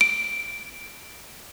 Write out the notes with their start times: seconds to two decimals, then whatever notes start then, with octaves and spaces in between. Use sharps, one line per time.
0.01 D7